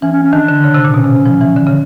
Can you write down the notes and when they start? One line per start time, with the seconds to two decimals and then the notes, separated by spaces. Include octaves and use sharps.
0.02 E3 C#4
0.13 C#4
0.23 C#4
0.33 D#3 D4
0.48 D3
0.64 C#3
0.74 C3
0.84 A#2
0.94 B2 C#4
1.04 C3
1.16 C3
1.26 F3
1.41 E3
1.57 D3
1.66 C#3